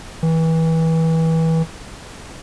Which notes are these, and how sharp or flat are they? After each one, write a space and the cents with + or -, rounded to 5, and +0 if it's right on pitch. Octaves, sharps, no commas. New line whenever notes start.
E3 -25